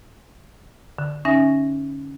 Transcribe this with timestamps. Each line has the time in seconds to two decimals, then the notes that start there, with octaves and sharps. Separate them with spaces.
0.99 D3
1.25 C#4 D#4 E5 G#5 A#6